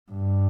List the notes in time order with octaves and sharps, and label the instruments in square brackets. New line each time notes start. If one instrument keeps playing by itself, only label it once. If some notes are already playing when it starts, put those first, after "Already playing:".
[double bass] G2